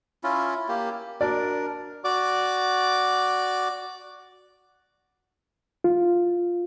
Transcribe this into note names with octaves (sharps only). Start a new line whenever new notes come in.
C#4 E4 F4
A#3 G4
D4 F#4 A#4 D5
F#4 D5 D6
F4